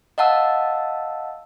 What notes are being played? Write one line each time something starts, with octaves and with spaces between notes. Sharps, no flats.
D#5 F5 F#5 A5 E6